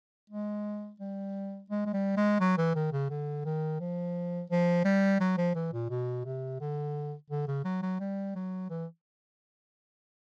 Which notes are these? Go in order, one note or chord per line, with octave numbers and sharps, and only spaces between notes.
G#3
G3
G#3
G#3
G3
G#3
F#3
E3
D#3
C#3
D3
D#3
F3
F3
G3
F#3
F3
E3
A#2
B2
C3
D3
D3
C#3
F#3
F#3
G3
F#3
E3